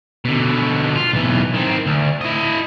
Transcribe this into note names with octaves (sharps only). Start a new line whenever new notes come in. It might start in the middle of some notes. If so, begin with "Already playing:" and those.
B2 D3
F4
B1 E3
D#3 C4
D2
E4 D#5